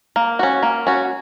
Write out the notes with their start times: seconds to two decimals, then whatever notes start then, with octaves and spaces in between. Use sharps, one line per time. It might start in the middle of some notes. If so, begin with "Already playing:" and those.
0.16 A#3
0.39 C#4 F#4
0.63 A#3
0.87 C#4 F#4